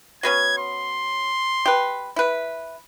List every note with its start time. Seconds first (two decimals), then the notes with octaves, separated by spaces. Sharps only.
0.23 F#3 B3 C#4 G#6
0.58 C6
1.66 G4 B4
2.16 E4 B4